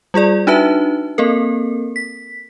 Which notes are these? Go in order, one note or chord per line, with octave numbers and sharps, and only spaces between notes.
G3 F4 G#4 D5
D4 D#4 F#4 B4 E5 A5
A#3 C4 A4 A#4
B6